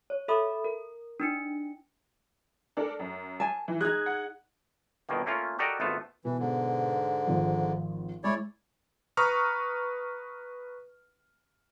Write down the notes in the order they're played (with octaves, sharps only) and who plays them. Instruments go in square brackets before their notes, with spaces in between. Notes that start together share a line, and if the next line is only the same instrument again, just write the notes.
[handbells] C#5
A4 E5 B5 D#6
A#4
D4 D#4 C#7
[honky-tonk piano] D4 A4 A#4
F#2
[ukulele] G#5 A5
[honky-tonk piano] E3
[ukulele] D#4 G#4 [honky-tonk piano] F#6 G#6
[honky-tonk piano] F#5
[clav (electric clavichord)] G1 B2 D#3 A#3
A3 A#3 C#4 F4
F#4 G4 A4 A#4 D5 D#5
G#1 A3 B3 F4 A5
[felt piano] B2 [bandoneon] E3
[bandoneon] G#2 D3
[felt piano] G#1 F3
[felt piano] G#3 [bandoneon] E4 C#5 D5
[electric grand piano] B4 A#5 C#6 D#6 F6